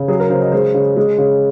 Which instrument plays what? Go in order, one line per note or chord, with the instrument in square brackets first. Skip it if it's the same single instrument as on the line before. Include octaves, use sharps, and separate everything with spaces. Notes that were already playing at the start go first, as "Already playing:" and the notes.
Already playing: [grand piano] C#3
F#3 G#4
A#4
C#3 C5
D#5
G#3 C5
C#3
G#3
C#3